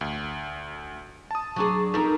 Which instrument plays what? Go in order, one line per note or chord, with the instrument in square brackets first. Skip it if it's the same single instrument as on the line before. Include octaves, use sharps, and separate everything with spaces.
[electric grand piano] D2
A5 D#6
[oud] F#3 D4 G#4 [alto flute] C#6
[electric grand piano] F2 [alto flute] D#4 [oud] A4 A#4